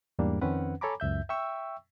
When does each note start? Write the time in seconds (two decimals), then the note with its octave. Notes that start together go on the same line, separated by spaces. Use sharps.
0.19 E2 G#2 G3 A#3 D4
0.41 F2 D#3 C4 C#4 B4 F#5
0.81 A4 C#5 G#5 A#5 B5 D6
1.00 C#2 F#2 E5 G6
1.29 E5 G5 C#6 E6